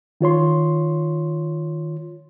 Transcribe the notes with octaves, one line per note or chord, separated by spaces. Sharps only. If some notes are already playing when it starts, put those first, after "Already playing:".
D#3 F4 C#5 C6